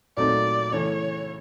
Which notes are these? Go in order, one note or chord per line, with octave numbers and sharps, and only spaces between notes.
A#2 F#3 A3 C4 D#4 D5
C#3 E3 A3 C#4 C#5